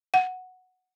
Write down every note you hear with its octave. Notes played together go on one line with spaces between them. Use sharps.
F#5